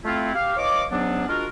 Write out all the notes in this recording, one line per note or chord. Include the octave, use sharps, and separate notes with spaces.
A3 C4 E4 F4
G4 F5
E3 C#5 D#5 F5 D6
G#2 F#3 B3 C#4 D4
G#3 D4 F4 F#4 A#4